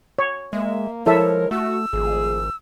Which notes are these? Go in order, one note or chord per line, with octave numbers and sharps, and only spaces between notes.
C#5
G#3 A#3 E5
F3 G#3 E4 A4 A#4 C#5 E5
A3 F#4 E6
G#1 F3 A3 G#4